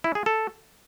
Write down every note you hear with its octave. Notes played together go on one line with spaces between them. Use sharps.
E4
G#4
A4